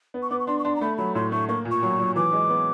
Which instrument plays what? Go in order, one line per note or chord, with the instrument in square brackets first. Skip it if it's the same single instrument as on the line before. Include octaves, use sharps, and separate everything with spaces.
[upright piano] B3
[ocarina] C#6
[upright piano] B3 [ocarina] D6
[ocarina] C#6
[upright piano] D4 [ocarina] C6
[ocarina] C#6
[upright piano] D4 [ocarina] C6
[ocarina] A#5
[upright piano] A3 [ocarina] B5
[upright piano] F#3 [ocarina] B5
[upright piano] A2 [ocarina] C6
[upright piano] A3 [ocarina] C#6
[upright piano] A#3 [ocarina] C#6
[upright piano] A#2
[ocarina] C#6
[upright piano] F#3
F#3
[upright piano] E3 [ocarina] D6
[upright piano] G#3
B3